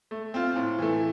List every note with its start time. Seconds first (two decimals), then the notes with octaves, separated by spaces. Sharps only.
0.11 A3
0.34 C4 F4
0.56 A2
0.79 E3 A3